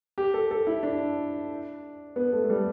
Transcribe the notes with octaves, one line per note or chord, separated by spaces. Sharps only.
G4
A4
A4
E4
D4
B3
A3
A3
G3